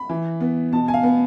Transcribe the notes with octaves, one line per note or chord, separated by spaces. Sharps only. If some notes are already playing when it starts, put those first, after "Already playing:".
Already playing: B5
E3
B3
B2 A5
G#5
F5
B3